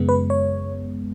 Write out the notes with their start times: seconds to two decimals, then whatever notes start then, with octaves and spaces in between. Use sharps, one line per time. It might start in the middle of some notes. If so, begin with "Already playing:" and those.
Already playing: F#2 C#3 G#3 B3
0.09 B4
0.30 C#5